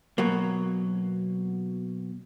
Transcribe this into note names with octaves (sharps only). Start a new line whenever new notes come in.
B2 F#3 A#3